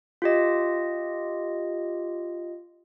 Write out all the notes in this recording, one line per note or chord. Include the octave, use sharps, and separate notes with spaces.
F4 G4 D#5